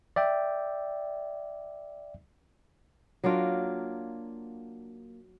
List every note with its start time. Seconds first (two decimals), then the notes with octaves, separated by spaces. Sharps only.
0.16 D5 E5 G5
3.24 F#3 A#3 D4 F4